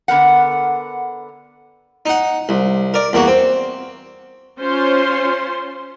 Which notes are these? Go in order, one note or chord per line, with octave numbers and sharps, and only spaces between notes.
D3 B3 A#4 F#5
D#4 F#5
C2
A#4 D5
E2 A#3 F#4
C4
C#4 F4 C5 C6